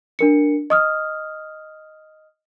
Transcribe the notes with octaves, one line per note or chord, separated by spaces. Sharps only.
D4 A#4 C#7
D#5 D#6 F6